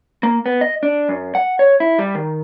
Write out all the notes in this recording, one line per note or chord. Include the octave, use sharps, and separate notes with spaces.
A#3
B3
D#5
D4
F#2
F#5
C#5
E4
G3
D#3